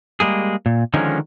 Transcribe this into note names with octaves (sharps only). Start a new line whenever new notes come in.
G3 G#3 A#3 G#4
A#2
D3 D#3 F3 G#3 C#4 D#4